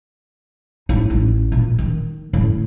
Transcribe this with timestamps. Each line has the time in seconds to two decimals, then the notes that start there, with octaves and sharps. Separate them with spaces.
0.89 A2 D#4
1.10 A1
1.52 A#2
1.78 D#3
2.33 A2 D3